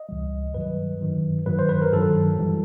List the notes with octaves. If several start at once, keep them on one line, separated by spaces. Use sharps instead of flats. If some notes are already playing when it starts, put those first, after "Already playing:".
Already playing: D#5
C#2 C3 E3 G3
G2 D#3 F#3 B4
G2 D#3 F#3
G2 D#3 F#3 B4
C5
B4
A#4
G2 D#3 F#3 A4
G2 E3 G3